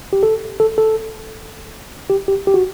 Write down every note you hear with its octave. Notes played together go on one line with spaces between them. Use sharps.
G4
A4
A4
A4
G4
G4
G4
F#4